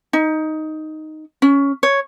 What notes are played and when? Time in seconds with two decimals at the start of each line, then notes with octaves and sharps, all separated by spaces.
0.13 D#4
1.42 C#4
1.83 C#5